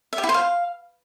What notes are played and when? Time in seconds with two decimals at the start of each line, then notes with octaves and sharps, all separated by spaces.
0.13 E5
0.18 G4
0.23 E4
0.29 C5
0.34 F5